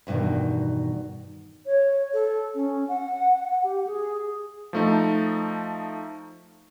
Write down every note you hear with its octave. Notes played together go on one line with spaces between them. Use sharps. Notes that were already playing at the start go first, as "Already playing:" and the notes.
E2 G2 B2 D#3
C#5
A4
C#4
F#5
F#5
G4
G#4
F3 A3 D#4